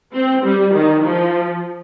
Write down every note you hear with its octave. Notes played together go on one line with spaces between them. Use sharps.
C4
G3
D#3
F3